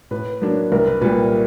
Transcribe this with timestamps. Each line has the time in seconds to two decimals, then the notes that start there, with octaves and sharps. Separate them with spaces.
0.11 A2 B4
0.42 F#3 A#3 D4
0.72 C2 A#4
0.86 B4
1.01 A#2 G3 A#3 B4